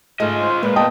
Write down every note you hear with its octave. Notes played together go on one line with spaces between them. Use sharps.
G#2 G#3 A3 F4 D#5
C5
A#2 G#3 B4
B3 D#5 G5 A5